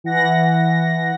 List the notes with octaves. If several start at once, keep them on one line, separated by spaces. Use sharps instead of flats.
E3 F#5 A#6